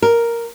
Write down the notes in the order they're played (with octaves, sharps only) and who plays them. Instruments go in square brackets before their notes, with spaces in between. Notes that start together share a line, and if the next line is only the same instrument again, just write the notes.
[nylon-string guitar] A#4